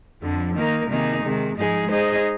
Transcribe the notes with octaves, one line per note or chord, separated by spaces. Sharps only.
F2 D3 F3
D#3 A#3 D#4 A#4
C3 D#3 A#3 D#4 G#4
C3 D#3 G#3
G#2 F3 G#3 D#4 G#4
G#3 D#4 G#4 C5 D#5